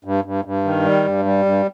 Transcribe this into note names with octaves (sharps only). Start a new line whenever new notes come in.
G2
G2
G2
D#3
G3
G2
G3
G2